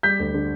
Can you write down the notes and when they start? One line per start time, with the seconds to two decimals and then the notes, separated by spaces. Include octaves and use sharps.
0.03 G3 G6 B6
0.19 D2
0.34 D3